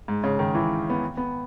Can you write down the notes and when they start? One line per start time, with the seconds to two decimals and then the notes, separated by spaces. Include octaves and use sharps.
0.08 G#2
0.24 C#3
0.39 D#3
0.55 E3
0.90 B3
1.17 B3